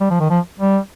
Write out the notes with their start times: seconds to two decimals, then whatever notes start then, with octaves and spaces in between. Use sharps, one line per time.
0.01 G3
0.10 F3
0.20 D#3
0.30 F3
0.59 G3